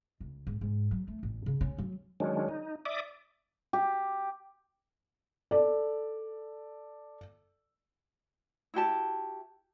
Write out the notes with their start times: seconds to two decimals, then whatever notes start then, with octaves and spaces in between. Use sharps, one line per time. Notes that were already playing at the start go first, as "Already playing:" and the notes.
0.20 C#2
0.47 G#2
0.61 G#2
0.91 F#3
1.08 A3
1.23 A1
1.46 C#3
1.61 C#4
1.78 F#3
2.20 D#3 F#3 G#3 C#4 D4
2.49 D#4
2.85 D5 E5 D6 D#6
3.73 G4
5.51 A4 D5
8.74 E4 F#4 G4 A5